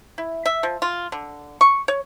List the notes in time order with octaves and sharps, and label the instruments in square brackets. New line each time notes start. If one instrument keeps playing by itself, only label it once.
[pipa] E4
E5
F3
F4
D3
C#6
C#5